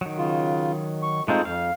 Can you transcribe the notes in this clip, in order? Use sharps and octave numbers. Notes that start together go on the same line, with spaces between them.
D#3 F#3
C#3 F4
C#6
G#3 A3 C4 D#4 F4 G#4
F2 F5